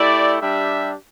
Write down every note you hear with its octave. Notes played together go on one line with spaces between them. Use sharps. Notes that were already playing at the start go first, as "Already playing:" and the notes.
Already playing: A3 E4 G4 D5
G3 D4 G4 E5